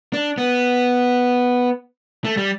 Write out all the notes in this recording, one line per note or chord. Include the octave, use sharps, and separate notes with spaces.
D4
B3
A3
G3